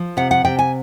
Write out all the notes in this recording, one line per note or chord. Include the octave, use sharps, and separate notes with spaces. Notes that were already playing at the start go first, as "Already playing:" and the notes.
Already playing: F3
C3 F#5
F#5
C3 G5
G#5